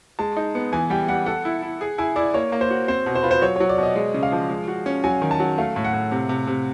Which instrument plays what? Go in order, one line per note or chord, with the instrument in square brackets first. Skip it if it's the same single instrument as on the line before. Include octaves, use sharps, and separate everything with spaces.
[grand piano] G#3 [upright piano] A5
[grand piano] D#4
B3
[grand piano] E3 [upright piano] G#5
[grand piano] G3 [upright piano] G5
[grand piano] G3 [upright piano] F#5
[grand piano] A4 [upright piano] F#5
[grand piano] E4
E4
G#4
[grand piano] E4 [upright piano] G#5
[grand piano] E4 [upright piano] D5
[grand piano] A#3 [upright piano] C#5
[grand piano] A#3
[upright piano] C5
[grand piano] F#4
[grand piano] C4 [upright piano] C5
[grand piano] B2
[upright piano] C5
[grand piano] F4 [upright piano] B4
[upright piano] C5
[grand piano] F#3 [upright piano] C#5
[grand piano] F#3 [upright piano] C#5
[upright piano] D5
[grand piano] B2 [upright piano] D#5
[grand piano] G#3
C#3
[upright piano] F5
[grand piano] F3
G#3
F#4
C#4
[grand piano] F#3 [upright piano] G#5
[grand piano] D#3
[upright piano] A5
[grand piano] F#3
[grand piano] A3 [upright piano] F5
[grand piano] A2
[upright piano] F#5
[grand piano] A2
C3
C3
C3